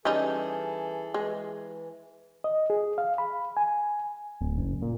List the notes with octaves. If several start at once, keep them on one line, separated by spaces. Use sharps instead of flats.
E3 G3 C#4 D#4 G#4 A4
E3 G#3
D#5
G#4
F5
B5
G#5
D1
F#1
A#2